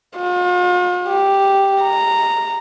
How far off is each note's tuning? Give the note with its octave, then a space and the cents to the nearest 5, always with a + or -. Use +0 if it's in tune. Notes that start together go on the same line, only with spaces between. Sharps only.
F4 +45
G4 +0
A#5 -10